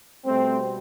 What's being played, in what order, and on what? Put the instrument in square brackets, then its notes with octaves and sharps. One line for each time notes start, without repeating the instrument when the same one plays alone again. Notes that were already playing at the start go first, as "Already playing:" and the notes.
[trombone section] B2 G3 A3 C4